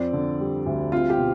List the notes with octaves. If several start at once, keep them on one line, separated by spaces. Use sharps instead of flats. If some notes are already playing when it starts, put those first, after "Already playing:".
Already playing: F2 C4 D5
D3
G3
D2
C4 F4
G4
B2